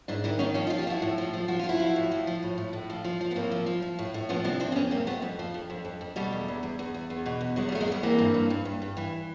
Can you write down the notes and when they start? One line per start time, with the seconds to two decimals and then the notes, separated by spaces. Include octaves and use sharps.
0.08 G#2 D4 E4
0.24 D#3 D4 E4
0.39 D#3 C#4 D#4
0.54 F3 C#4 D#4
0.67 D#4 F4
0.70 F3
0.78 F4 G4
0.87 F3 E4 F#4
1.02 A2
1.18 F3
1.34 F3
1.48 F3 F#4
1.59 F4
1.64 F3
1.69 E4 F#4
1.80 F3
1.96 A2
2.11 F3
2.27 F3
2.43 A2
2.58 A2
2.73 A2
2.90 F3
3.04 F3
3.21 F3
3.31 B3
3.35 A2 A#3 C4
3.51 F3
3.66 F3
3.82 F3
3.99 A2
4.14 A2
4.29 F3 B3 C#4
4.44 C3 C4 D4
4.60 F3 C4 D4
4.72 C4
4.76 F2 B3 C#4
4.91 C3 A#3 C4
5.07 F2 A3 B3
5.22 F2
5.39 F3
5.54 F2
5.70 F2
5.85 F2
6.01 F2
6.16 B2 G3 A3
6.33 E2
6.48 E2
6.63 E2
6.79 E2
6.94 E2
7.10 E2
7.26 B2
7.41 E2
7.56 E2 F#3 G#3
7.69 G3
7.72 E2 A3
7.80 F#3 G#3
7.88 E2 G3
8.03 E3 A#3 C4
8.18 G2
8.34 G2
8.50 G2
8.65 G2
8.82 G2
8.97 E3